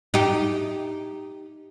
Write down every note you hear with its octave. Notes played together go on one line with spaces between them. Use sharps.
D#4 G4